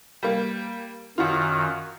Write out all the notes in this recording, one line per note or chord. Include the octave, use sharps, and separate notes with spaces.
G3 A#3
F#2 D#3 F4 F#4